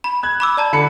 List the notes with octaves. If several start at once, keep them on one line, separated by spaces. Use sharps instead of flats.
B5
F#6 G#6
B5 D6 E6
D5 A5 A#5
D3 B5 C#7